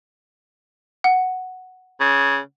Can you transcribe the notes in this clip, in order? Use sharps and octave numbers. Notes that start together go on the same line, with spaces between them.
F#5
C#3